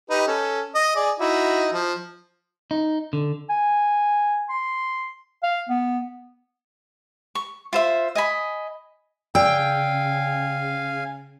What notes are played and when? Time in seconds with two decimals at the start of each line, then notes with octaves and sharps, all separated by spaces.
0.10 D#4 G4 B4
0.28 C#4 A4
0.75 D#5
0.96 G#4 D5
1.20 D#4 E4 F#4
1.73 F3
2.71 D#4
3.13 D3
3.49 G#5
4.49 C6
5.43 F5
5.69 B3
7.35 C#6
7.73 F4 C5 E5
8.15 D#5 G#5 B5
9.35 C#3 D5 F5 G5 G#5 E6